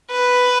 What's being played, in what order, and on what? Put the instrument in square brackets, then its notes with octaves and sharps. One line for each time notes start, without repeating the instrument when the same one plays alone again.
[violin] B4